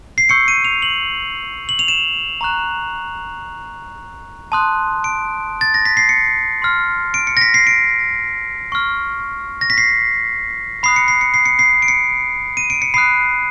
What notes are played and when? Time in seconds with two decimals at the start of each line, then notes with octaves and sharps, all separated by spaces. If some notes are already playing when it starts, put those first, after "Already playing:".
0.18 C7
0.29 C#6 E6 G6 C#7
0.48 D#7
0.65 F7
0.82 F#7
1.69 F#7
1.79 F7
1.88 E7
2.41 A#5 C#6 F#6
4.52 A5 C6 D#6 F#6
5.04 D7
5.61 A6
5.74 A#6
5.85 B6
5.97 C7
6.09 C#7
6.62 C6 F6
7.14 D7
7.27 C#7
7.37 A#6
7.41 B6
7.54 C7
7.67 D7
8.72 C#6 F6
9.61 A#6
9.70 B6
9.78 C7
10.83 B5 D#6 F#6 C7
10.96 C#7
11.08 C7
11.21 C#7
11.34 C7
11.46 C#7
11.59 C7
11.82 D7
11.88 C#7
12.57 D#7
12.70 D7
12.82 C#7
12.94 B5 D#6 F#6 C7